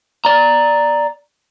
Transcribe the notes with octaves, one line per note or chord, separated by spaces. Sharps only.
D5 A#5